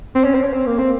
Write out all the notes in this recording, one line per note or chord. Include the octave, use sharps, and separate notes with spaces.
C4
C#4
C4
C#4
C4
A#3
C4